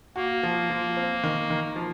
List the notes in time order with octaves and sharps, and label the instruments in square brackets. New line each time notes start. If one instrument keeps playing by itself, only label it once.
[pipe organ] A#3 [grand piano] F#4
[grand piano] F3
F3
C4
D#3
D#3
F3